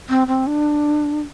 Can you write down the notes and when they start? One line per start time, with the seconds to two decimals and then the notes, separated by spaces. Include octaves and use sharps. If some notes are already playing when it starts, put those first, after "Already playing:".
0.09 C4
0.27 C4
0.47 D4